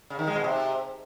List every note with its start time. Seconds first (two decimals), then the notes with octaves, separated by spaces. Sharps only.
0.10 C#3
0.19 D#3
0.27 G#3
0.36 B2
0.44 C3